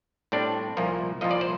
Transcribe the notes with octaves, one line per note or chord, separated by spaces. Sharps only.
A2 G3 C4 D4 D5
C2 A#2 F3 A#3
C2 A#2 F3 A#3 D#5
D5
C5